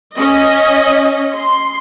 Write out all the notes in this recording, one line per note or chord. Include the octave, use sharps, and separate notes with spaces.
C#4 D#5
C6